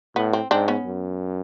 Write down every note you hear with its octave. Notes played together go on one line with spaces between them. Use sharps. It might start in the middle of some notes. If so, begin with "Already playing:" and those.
A2 B3
C4
G#2 C4 D4
B3 C#4
F#2